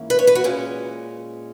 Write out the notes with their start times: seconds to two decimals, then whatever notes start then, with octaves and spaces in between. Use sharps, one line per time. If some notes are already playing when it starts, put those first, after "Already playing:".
Already playing: G#2 E3 A#3 C#4 E4
0.10 B4
0.19 C#5
0.27 B4
0.35 F#4
0.44 A#2 G#3 C#4